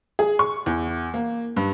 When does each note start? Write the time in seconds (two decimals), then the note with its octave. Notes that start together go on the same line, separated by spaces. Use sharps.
0.19 G#4
0.39 C#6
0.66 E2
1.14 A#3
1.57 G2